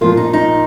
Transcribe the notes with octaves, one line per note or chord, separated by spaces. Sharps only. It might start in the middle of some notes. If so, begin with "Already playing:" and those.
A#2 F3 A#3 F4
D#4
D#4